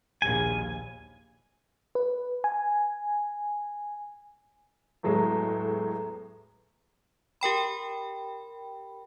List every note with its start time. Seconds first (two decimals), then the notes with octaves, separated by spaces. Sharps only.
0.22 A#1 D#2 G#5
1.95 B4
2.44 G#5
5.03 E2 A2 F#3 G#3 A3
7.41 G4 A#4 G5 B5